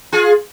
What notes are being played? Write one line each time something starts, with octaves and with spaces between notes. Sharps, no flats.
F4 G#4